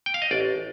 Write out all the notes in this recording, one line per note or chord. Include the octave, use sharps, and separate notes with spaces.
G5
F5
D#5
A1 D5